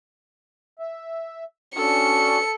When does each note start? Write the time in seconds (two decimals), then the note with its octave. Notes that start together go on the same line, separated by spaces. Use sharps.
0.79 E5
1.76 C#4 D4 F#4 A4 C#7